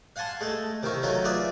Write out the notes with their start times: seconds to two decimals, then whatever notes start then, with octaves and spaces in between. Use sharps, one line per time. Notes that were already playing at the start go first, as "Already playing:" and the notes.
0.16 F5 F#5 G#5 A5 C6
0.41 G#3 A3 A4
0.83 C3 D#3 E4 F5 C#6
1.03 D#3 F#3 A3 C#4 D#4 F4
1.25 F4 G#4 B4 D5 E5